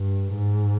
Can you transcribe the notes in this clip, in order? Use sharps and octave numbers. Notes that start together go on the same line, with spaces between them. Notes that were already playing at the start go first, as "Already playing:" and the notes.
Already playing: G2
G#2